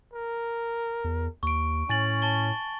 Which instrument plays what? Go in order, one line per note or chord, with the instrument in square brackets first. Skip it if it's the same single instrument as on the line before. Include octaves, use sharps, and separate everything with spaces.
[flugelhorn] A#4
[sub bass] E2
[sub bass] D#2 [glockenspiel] C#6 D7
[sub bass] A2 [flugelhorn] C#4 [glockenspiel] G#5 A6 F#7
[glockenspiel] A5 A6 G7